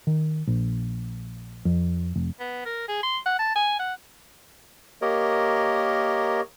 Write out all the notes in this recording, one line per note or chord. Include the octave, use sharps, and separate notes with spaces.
D#3
A#1
F2
F1
B3
A#4
G#4
C6
F#5
A5
G#5
F#5
A#3 G4 A#4 C#5 D#5